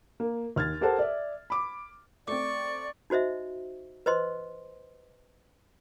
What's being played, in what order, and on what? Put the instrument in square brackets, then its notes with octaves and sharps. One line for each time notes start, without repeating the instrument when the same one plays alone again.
[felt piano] A#3
D#2 F6 G#6 A6
G4 A4 A#4 C5 F#5 A5
D5 E5
B5 D6
[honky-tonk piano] A3 C4 [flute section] D5 [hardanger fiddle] C#6 [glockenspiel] D6
[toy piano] D#4 F#4 C5 D#5 E5
B4 C5 D#5 C6